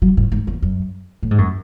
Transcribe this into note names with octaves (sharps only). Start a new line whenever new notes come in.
F#3
A2
G#2
E2
F#2
A2
G#2
F#2